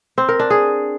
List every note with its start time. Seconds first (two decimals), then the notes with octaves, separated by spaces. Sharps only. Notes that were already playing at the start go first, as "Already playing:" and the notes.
0.18 C4
0.29 A#4
0.39 D4
0.50 G#4